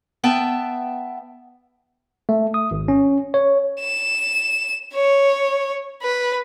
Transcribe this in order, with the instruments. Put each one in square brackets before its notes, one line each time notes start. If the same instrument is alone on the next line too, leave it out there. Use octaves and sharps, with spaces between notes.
[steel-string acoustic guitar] B3 E5 G5 A5
[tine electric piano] A3
D#6
G#1
C#4
C#5
[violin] E7
C#5
B4